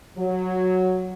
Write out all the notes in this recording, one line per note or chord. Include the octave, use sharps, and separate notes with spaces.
F#3